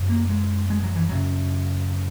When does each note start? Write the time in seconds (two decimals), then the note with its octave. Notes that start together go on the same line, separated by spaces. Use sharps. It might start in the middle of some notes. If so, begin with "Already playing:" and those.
Already playing: F#2 C#3
0.09 A#3
0.29 G#3
0.70 G#3
0.83 F#3
0.96 E3
1.09 F#2 C#3 F#3